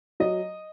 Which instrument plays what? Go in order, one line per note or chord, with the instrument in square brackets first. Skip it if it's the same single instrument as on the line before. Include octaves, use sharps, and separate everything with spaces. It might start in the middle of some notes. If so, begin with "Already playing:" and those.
[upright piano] F#3 D#5